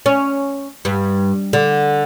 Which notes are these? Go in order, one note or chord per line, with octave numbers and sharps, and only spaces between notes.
C#4
G2
D3